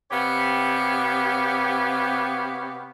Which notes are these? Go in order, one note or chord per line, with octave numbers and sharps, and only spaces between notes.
C3 B3 G4 C#5 F5